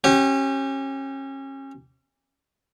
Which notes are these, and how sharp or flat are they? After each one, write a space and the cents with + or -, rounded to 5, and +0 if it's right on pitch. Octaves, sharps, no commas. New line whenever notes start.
C#4 -30 G4 -15